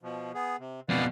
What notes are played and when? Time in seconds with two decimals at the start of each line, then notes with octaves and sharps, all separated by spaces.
0.02 B2 F3
0.34 B3 G#4
0.59 C3
0.89 F2 B2 B4 D5 F5